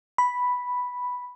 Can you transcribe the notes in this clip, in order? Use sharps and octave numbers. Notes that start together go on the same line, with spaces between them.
B5